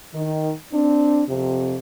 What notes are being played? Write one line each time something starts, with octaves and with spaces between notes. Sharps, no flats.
D#3
C4 D4
F2 C3